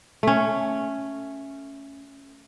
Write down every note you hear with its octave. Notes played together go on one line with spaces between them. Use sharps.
A3 C#4